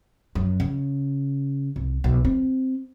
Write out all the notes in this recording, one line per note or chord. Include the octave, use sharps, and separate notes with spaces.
F#2
C#3
C2
B1
C4